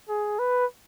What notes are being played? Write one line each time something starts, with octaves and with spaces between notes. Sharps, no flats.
G#4
B4